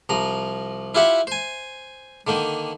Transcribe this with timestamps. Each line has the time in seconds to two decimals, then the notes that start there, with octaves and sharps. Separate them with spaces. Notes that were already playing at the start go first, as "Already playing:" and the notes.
0.09 C2 F3 A#5
0.95 E4 F4 G4 E5 F#5
1.27 C5 G#5
2.27 D3 D#3 A#3 G5